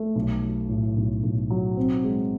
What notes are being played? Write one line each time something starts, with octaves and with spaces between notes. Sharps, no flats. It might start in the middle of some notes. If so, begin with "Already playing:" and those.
Already playing: A3
B1
F#3
A2
B1
B1
F#3
C4
G#3